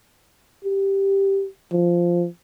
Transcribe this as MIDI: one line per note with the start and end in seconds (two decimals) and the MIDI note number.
0.64 1.47 67
1.72 2.27 53